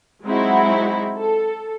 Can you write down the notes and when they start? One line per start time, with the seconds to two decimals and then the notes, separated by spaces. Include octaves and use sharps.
0.24 F#3 G#3 C4 D#4 E4 F#4
1.17 A4